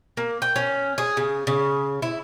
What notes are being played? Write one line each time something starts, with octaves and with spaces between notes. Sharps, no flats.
A#3
G5
C#4
G#4
C#3
C#3
E4